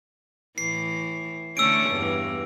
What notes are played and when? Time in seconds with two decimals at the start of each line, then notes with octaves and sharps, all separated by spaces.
0.58 A2 E3 C7
1.57 D3 A3 C#4 E6 D7
1.90 E2 G2